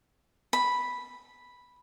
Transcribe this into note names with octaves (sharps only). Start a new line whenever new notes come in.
B5